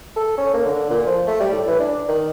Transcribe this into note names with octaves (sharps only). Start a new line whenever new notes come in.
A4
C#4
A#3
D3
A#2
F3
A3
G3
A2
E3
D4
D#3